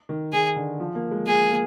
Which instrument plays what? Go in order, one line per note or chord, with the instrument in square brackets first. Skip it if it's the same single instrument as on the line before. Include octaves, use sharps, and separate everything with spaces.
[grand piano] D#3
[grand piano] D#3 [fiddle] G#4
[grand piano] D3
F3
A#3
G#3
[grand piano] A#3 [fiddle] G#4
[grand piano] A#3